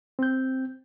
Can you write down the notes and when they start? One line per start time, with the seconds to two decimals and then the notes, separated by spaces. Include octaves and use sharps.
0.19 C4 G6